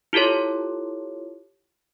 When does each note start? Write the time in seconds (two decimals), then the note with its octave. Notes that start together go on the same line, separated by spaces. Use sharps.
0.13 E4 F4 G4 A4 C#5